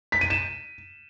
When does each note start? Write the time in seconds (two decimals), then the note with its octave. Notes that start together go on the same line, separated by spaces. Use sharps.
0.12 B6
0.21 D#7
0.30 E7